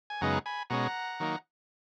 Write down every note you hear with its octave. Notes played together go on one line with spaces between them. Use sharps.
G#5
F#2 C#3 G#3 B3 D#4 F#5 A#5
G#5 B5
B2 G#3 C#4 F#5 A#5
D#3 F#3 A#3 D#4